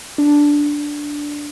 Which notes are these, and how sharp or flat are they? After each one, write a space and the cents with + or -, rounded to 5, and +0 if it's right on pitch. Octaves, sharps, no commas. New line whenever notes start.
D4 -5